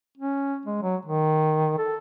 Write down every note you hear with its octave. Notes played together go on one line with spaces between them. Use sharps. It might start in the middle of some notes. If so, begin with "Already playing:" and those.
C#4
G#3
F#3
D#3
A4